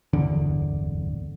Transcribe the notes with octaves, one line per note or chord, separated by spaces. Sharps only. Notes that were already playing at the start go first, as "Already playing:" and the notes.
D1 G1 E2 D3